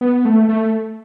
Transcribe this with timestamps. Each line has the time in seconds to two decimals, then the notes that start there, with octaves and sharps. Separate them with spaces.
0.01 B3
0.25 A3
0.49 A3